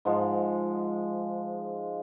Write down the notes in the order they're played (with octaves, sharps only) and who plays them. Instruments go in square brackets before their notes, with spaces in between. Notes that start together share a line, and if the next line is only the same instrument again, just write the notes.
[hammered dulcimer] G#2 F3 G#3